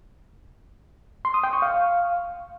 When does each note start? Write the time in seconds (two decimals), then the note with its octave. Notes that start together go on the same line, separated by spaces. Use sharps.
1.25 C6
1.34 D#6
1.44 G5
1.53 C#6
1.62 F5